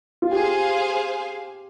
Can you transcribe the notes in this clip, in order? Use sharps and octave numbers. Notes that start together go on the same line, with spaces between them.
F4
G4 G#4 C5 F5 G#5